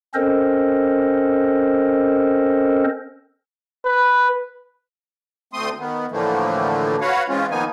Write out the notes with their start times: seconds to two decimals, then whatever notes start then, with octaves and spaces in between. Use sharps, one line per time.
0.14 C4 C#4 A4 A#4 C5 D#5
3.85 B4
5.53 D2 A3 C4 C6 D#6
5.79 D#3 B3
6.11 A2 D3 E3 F3 A3 A#3
7.01 F#4 B4 C#5 F5 F#5
7.29 E3 G#3 C4 C#4 F4
7.51 D#3 F3 A#3 B3 D#4 G#5